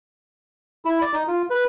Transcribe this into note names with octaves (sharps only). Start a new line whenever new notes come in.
E4
D5
D#4
F4
B4